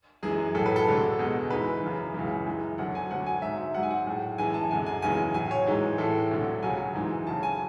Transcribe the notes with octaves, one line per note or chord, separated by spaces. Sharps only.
F#2 E3 G#3 G#4
A2 F#3 A4
B4
A4
D2 D3 G#3
E2 B2 G#3
G#2 E3 G#3 B4
F#2 C#3 E3
C#2 C#3 E3
F#2 E3 G#3
D2 D3 F#3 F#5
G#5
D2 D3 F#3 F#5
G#5
G#2 F#3 E5
G#2 F#3 F#5
G#5
F#5
A2 G#3
F#2 E3 G#3 G#5
A5
F#2 D3 G#3 G#5
G#5
E2 C#3 E3 G#3 G#5
A2 F#3 G#5
C#5
G#2 E3 G#3
A2 E3 G#3 A4
D2 D3 F#3
C#2 C#3 F#3 G#5
G#2 E3 G#3
D2 C#3 F#3 A5
G#5